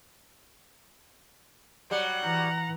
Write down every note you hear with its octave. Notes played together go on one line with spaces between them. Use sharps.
F#3 G3 F#5
E3 A#5